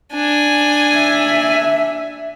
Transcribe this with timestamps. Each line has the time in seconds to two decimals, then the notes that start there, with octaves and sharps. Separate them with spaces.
0.13 D4 G#5
0.95 E5